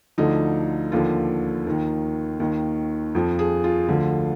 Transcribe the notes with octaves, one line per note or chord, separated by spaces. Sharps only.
D2 D3 F3 D#4
D#2 D3 F3 F4
D#2 D#3
D#2 D#3
F2 F3
G#4
F4
D2 D3 F3